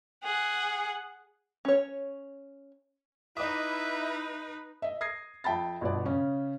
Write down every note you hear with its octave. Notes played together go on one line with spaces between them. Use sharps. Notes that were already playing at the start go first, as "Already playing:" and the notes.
G#4 F#5
C#4 C#5
D#4 E4 B4 D#5 E5 D6 D#6
D#5 E5
D#6 G#6 A#6 C7
F2 E5 G5 A5 B5 A6
G1 B2 B3 D5
C#3 C#4